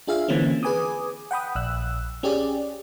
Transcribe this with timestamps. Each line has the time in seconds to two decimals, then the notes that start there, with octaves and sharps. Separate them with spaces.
0.07 D4 F4 G#4 E5 F5
0.28 D3 E3 A#3 C4 C#4
0.63 G#4 B4 G#5 D6 D#6
1.31 F#5 G5 B5 D#6
1.55 A#1 E6 F#6
2.23 C#4 G4 G#4 D5